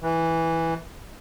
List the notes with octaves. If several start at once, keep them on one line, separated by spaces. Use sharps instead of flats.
E3